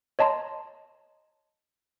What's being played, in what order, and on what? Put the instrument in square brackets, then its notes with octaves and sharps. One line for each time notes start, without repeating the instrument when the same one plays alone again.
[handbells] C#5 D#5 A5 A#5 C6